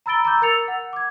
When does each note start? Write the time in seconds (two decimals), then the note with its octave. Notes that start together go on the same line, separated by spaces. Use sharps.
0.06 A#5 B5 E6 A6 D7 G7
0.25 A#5 B5 D6 E6 G6
0.42 A#4 E6 A6 C#7 F7
0.68 F#5
0.93 D6 G#6